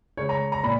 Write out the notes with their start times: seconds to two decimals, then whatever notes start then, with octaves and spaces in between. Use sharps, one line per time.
0.17 C#3 G#3 C#5
0.29 A#5
0.52 A#5
0.64 A#2 B5